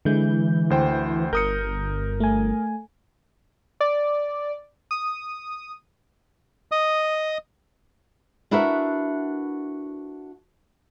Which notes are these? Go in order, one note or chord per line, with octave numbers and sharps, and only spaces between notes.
D3 E3 G#3 G6
D2 C5 G5
G1 A#4 D#6 G6 C#7
A3 G#5
D5
D#6
D#5 D#6
D4 E4 F#4 A#4 B4 E5